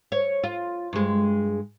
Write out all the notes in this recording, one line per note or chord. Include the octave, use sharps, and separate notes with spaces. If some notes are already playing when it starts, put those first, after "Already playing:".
C#5
F4
G2 G#3